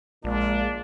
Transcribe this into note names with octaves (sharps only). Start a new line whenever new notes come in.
A#1 A#2 G#3 D4